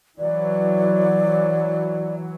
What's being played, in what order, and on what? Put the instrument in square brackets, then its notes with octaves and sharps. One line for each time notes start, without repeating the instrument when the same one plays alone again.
[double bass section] E3 F#3 [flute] D5